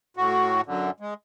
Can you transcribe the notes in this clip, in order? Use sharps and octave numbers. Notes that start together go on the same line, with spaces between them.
A2 F#4
F#2 D3
G#3